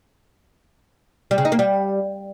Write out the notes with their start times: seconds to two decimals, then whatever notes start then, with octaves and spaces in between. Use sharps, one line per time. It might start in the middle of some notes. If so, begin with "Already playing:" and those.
1.31 G3
1.38 C#3
1.45 D#4
1.52 A#3
1.59 G3